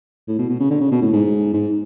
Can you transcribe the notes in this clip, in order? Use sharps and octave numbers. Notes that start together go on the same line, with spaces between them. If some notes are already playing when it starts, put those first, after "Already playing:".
A2
B2
B2
C#3
D3
C#3
B2
A2
G#2
G#2